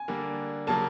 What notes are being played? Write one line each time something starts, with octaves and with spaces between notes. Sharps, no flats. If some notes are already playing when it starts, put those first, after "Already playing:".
Already playing: G#5
D3 G3 A#3 D4
C#3 F#3 A#3 A5